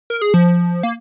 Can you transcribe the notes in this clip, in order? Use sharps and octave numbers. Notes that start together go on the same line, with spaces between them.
A#4
G#4
F3
A#3